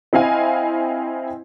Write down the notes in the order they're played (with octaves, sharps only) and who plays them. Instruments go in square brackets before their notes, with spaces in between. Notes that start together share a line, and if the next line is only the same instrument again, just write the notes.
[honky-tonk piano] C4 E4 D#5 F5 G#5